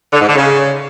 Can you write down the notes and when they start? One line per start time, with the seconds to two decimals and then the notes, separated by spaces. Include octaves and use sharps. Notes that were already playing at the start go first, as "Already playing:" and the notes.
0.13 D3
0.21 G#2
0.28 D3
0.36 C#3